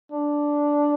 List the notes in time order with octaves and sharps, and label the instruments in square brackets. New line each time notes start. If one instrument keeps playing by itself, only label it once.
[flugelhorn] D4